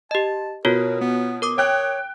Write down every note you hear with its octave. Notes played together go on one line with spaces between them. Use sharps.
G4 D#5 A5
B2 F4 F#4 A#4 C#5
B3
A#4 D6 D#6
C#5 G5 F#6